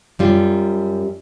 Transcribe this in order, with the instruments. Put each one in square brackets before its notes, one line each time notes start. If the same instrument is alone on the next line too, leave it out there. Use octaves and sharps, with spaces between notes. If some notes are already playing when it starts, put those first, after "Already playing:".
[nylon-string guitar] F#2 G3 F4